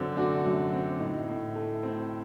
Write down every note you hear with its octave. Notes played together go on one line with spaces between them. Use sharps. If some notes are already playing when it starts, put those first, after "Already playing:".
Already playing: F#2 D3 C4 F#4
A3 D4 F#4
F#2
C4
A2 D#4
A2
A3
C4